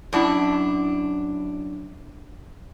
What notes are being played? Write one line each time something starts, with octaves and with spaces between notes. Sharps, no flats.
F#2 D4 E4